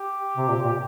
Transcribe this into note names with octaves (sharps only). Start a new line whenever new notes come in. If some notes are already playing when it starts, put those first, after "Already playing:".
Already playing: G4
C3
A#2
A#2